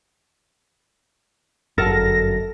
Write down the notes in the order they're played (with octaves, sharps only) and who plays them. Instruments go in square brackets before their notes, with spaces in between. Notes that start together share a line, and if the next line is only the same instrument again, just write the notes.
[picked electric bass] G1 F#2 [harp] A4 A#4 [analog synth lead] A#6